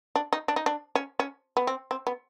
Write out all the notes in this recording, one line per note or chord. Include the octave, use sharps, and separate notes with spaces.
D4
D#4
D4
D#4
D4
C#4
C#4
B3
C4
C4
B3